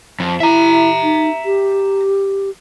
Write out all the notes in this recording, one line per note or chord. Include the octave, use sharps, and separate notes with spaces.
F2
E4 E5 A#5
D#4
G4